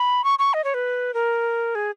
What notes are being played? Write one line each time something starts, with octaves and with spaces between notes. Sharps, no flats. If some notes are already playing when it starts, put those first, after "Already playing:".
Already playing: B5
C#6
C#6
D#5
C#5
B4
A#4
G#4